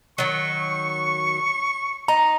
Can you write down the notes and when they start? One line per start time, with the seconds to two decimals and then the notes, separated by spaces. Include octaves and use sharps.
0.18 D#3 F#3 C#6
2.08 D#4 A#5